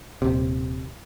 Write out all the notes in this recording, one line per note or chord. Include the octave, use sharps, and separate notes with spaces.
D#1 C3